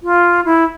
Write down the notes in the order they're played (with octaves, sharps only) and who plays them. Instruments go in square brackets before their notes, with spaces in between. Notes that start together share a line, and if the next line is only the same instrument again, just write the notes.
[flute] F4
E4